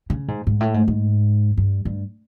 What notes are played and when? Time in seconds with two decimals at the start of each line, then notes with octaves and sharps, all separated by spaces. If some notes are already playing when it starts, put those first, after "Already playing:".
0.10 C#3
0.28 G#2
0.47 G#2
0.60 A2
0.74 G#2
0.88 G#2
1.57 G2
1.85 G2